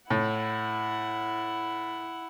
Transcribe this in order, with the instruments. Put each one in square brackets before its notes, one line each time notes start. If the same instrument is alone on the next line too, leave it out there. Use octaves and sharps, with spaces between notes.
[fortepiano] A2 [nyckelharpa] E4 F#5